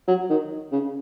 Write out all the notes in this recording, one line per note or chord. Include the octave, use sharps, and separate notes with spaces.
F#3
D#3
C#3